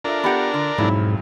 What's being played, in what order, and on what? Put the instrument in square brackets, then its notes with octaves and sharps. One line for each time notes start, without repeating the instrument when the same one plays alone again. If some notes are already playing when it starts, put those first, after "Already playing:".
[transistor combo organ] D4 A#4 [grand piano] F4 A4 E5
[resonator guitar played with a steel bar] B3 G4 F#5
D3
[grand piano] B1 F2 F#3 [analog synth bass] G#2 [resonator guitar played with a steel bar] E4